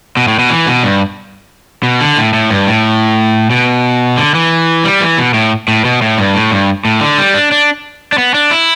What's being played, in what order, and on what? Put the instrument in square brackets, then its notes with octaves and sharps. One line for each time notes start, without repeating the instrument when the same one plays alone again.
[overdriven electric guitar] B2
A2
B2
E3
B2
G2
B2
D3
A2
A2
G2
A2
B2
D3
E3
G3
E3
B2
A2
A2
B2
A2
G2
A2
G2
A2
D3
G3
D4
D4
D4
B3
D4
E4